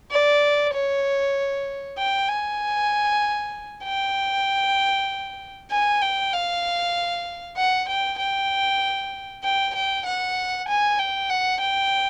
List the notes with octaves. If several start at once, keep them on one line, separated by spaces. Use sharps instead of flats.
D5
C#5
G5
G#5
G5
G#5
G5
F5
F#5
G5
G5
G5
G5
F#5
G#5
G5
F#5
G5